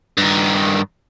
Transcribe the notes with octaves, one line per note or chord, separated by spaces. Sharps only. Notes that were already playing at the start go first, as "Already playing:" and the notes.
G2 D#3